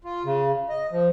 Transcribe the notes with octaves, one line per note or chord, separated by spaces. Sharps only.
F4
C#3
D#5
F3